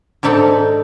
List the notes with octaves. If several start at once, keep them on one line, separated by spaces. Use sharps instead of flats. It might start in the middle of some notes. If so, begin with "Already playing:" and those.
G#2 D4 D#4 A4